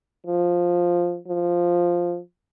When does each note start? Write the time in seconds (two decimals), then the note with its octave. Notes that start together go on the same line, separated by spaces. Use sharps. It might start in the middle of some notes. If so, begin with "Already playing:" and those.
0.26 F3
1.28 F3